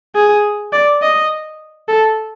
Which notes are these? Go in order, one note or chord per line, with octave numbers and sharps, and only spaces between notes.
G#4
D5
D#5
A4